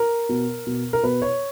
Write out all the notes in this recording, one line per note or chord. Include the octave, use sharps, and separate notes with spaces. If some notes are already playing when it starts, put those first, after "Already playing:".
Already playing: A#4
B2
B2
A#4
B2 B4
C#5